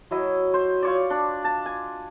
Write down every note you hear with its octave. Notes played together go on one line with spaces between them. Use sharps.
F#3 E4 D#5
C5
F4 C#5 D5
D4
A5
G#5